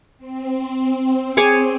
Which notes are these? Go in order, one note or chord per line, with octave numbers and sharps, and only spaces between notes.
C4
G#4 C#5 D6